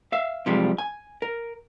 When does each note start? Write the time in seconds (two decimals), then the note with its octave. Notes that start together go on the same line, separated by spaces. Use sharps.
0.12 E5 F5
0.46 F#2 C3 F3 G3 G#3
0.78 G#5
1.22 A#4